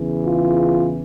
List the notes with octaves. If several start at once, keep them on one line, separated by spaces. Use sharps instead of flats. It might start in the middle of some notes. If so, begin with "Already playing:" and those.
Already playing: E2 C#3 E3
F4